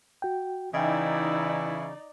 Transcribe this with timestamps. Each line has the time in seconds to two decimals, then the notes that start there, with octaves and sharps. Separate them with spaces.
0.22 F#4 G5
0.74 C#3 E3 D#4 E4 D5 D#5 G5 G#5